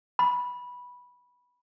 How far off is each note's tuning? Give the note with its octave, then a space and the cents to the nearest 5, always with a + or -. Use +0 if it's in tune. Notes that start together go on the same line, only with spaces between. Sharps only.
B5 -10